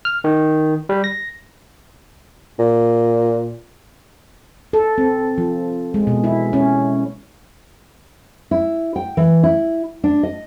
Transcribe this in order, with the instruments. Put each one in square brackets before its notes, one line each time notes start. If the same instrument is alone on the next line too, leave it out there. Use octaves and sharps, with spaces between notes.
[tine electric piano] F6
D#3
G3
A#6
[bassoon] A#2
[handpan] A4
C4
F3
G#3
B2
E4
C#4
[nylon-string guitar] E4
G5
E3
E4
D4
D#5